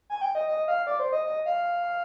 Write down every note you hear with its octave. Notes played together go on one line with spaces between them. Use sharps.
G#5
G5
D#5
D#5
F5
D5
C5
D#5
D#5
F5